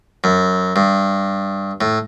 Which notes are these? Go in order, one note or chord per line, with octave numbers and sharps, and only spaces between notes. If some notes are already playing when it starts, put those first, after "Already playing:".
F#2
G2
A2